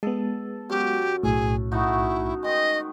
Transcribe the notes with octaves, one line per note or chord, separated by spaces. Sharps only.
G#3 B3 A4
F#2 G4
B1 A2 G#4
A3 D#4 E4 F#4
D#3 G#3 D#5